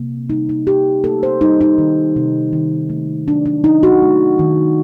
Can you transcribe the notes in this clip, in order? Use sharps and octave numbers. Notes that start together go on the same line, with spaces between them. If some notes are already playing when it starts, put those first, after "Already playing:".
Already playing: C3 A#3
G3 D#4
D#4
C3 G4
A#3 A4
C5
G3 D#4
D#4
D#3
C3
D#3
A3
F#3 D4
D4
D#3 D#4
F#4
A3
D#3